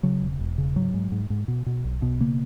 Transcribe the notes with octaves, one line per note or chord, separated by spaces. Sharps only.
C#3 F#3
E1
E1
C#3
G#2 F#3
G#2
G#2
G#2
B2
B2
B1
B2
C#3 A#3